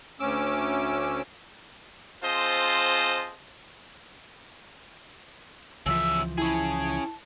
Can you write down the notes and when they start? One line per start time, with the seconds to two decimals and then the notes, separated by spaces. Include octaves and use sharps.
0.20 D2 C#4 D6 E6
2.23 C4 F4 G#4 C5 D#5 A5
5.86 C#2 C#3 E3 F3 E5 E6
6.38 C#4 E4 G#4 A5